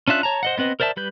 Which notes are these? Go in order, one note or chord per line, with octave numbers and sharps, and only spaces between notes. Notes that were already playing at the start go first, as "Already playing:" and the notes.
C#4 D4 F4 E5 F#6
C#5 A5 A#5
C5 D#5 F#5
B3 C4 B4 D#5
A#4 C5 D5 E5 A5
G3 B4 G6